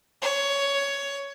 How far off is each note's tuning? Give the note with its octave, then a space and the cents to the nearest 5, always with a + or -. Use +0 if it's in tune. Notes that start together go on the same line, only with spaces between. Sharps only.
C#5 +15